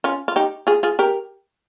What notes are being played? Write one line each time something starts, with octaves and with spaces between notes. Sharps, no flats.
C#4 F4
F4
D#4 G4
F4 G#4
F4 G#4
G4 A#4